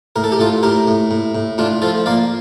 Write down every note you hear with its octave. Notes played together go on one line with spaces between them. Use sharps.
A2 A#4
A4
G4
A2 F4 A4
A2 G4 A#4
A2
A2
A2
A2 D4 F4
F3 F4 A4
A#3 D5 F5